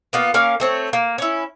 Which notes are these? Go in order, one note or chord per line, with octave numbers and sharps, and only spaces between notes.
A#3 B3 F4
A#3 C#4 A#4 F5
A3 C4 C#5
A#3
C#4 E4